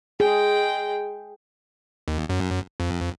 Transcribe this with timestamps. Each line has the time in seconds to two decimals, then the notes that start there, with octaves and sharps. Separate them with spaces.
0.20 G#3 G#4 G5
2.08 D#2
2.29 F#2
2.80 F2